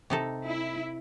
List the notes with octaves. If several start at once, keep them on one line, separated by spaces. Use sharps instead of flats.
C3 D#4 A4
E4